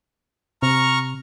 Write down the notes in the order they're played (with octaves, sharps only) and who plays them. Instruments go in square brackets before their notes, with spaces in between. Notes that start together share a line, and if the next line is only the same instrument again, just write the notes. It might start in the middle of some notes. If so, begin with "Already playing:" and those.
[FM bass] C3 [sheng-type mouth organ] A#5 C#6 F6